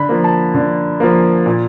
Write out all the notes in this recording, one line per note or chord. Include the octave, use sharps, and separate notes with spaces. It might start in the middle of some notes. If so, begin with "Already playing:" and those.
Already playing: D3 B5
F3 A#3
A5
D3
F3 A#3
A#2